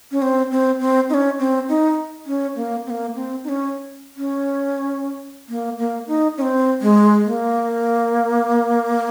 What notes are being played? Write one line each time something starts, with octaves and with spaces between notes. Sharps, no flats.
C#4
C4
C4
C4
D#4
C#4
C4
D#4
C#4
A#3
C4
A#3
C4
D#4
C#4
C#4
A#3
A#3
D#4
C#4
C4
G#3
A#3